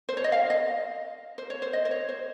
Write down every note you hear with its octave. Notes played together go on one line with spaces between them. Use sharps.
C5
C#5
D#5
F5
D#5
C5
C#5
C5
D#5
C5
C#5
C5